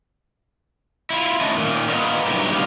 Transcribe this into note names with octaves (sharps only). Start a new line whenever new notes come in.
E4 F4
A3 C#4 D4 D#5 E5 A5
A#2 D#3
F4 A#4 B4 D#5 F5 F#5
G2 B2 F#3 D#4 E4 G4
G2 C3 G3 D#4 G#4 F5